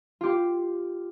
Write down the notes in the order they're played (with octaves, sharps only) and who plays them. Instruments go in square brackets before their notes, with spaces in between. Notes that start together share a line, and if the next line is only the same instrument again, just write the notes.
[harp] F4 G4